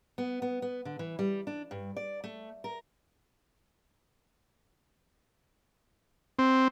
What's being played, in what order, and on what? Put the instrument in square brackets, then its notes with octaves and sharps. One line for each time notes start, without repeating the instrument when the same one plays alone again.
[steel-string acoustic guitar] B3
B3
B3
D3
E3
G3
D4
G2
D5
A3
A#4
[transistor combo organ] C4